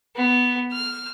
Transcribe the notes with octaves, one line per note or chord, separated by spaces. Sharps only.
B3
F6